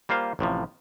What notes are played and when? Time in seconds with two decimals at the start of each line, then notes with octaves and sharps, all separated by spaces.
0.09 G3 A#3 F4 C5 F5
0.39 A1 A2 C3 F3